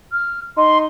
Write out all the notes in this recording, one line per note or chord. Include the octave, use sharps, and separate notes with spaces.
F6
D#4 C6